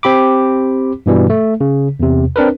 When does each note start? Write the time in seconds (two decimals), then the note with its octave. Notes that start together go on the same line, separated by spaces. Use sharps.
0.03 C4 G4 B5 D6
1.06 G2 B2 E3 G3
1.30 A3
1.61 C#3
2.00 E2 C3
2.36 C4 D4 A#4 B4